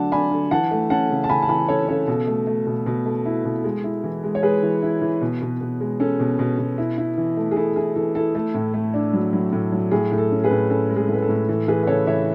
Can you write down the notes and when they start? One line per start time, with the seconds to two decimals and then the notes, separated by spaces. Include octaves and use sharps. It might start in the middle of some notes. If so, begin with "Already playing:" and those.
Already playing: D3 F#3 A3 D4 F#5 A5
0.12 D4 G#5 B5
0.31 D3
0.51 E3 F#5 A5
0.71 A3
0.90 C#4 F#5 A5
1.10 C#3
1.24 A5
1.29 C#3 G#5 B5
1.42 A5
1.49 E3 G#5 B5
1.69 C#4 A4 C#5
1.88 C#3 A4 C#5
2.07 B2 A4
2.27 A3
2.47 A3
2.67 B2
2.86 B2
3.06 A3
3.26 E4
3.45 B2
3.64 G#3
3.84 E4
4.04 E3
4.24 G#3
4.35 C#5
4.43 G#3 G#4 B4
4.63 E3
4.82 E4
5.02 E3
5.21 B2
5.42 B2
5.61 B2
5.81 G#3
6.00 C#4 A4
6.20 B2
6.39 B2
6.59 B2
6.78 E4
6.98 E4
7.17 E3
7.37 A3
7.51 G#4
7.56 E4 A4
7.76 E4 G#4
7.96 E3 A4
8.15 E4 A4
8.35 A3 A4
8.54 A2
8.74 A3
8.94 D4
9.13 F#3
9.33 F#3
9.53 A2
9.72 F#3
9.91 A2 G#4
10.12 A2
10.18 A4
10.31 C#4
10.44 G#4 B4
10.51 A2
10.70 C#4 A4
10.89 G#3
10.96 G#4
11.09 A2 B4
11.22 A4
11.29 A2
11.49 E3 A4
11.68 E3 G#4 B4
11.83 B4
11.87 C#3 A4 C#5
12.07 E3 C#5 E5